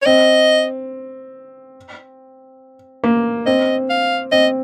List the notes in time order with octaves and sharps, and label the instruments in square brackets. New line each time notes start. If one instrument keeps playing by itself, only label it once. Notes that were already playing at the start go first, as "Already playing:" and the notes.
[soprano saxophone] C#5
[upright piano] C4 [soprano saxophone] D#5
[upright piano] A#3
[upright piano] C4 [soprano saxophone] D#5
[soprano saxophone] F5
[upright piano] C4 [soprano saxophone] D#5